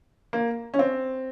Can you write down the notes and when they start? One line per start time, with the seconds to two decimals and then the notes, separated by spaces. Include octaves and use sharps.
0.33 A#3
0.74 C#4
0.79 C4